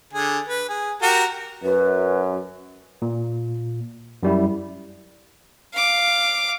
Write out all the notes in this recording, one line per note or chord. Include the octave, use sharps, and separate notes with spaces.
D3 G#4
B4
G#4
F#4 G4 A#4
F#2 B4
A#2
F#2 G3 E4
F5 D6